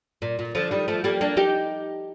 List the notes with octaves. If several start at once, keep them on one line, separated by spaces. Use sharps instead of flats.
A#2
A#2
D3 F3
D#3 G3
F3 A3
G3 A#3
A#3 D4
D#4 G4